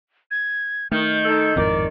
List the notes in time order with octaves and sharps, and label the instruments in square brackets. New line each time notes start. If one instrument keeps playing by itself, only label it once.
[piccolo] G#6
[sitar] D#3 [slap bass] A3 [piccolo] G6
[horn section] D#4 A4
[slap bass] G#1 F2 A2 [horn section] A#4 D5